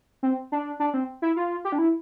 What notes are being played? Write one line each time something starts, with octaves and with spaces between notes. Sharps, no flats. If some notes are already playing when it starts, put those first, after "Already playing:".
C4
D4
D4
C4
E4
F4
G4
D4
E4